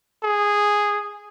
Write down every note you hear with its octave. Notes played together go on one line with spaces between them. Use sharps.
G#4